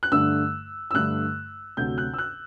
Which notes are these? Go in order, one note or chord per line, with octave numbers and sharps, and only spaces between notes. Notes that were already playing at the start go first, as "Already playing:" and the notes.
F#6
G2 D3 A3 E6
E6
G2 D3 A3 F#6
D2 C3 F#3 G6
F#6
E6
F#6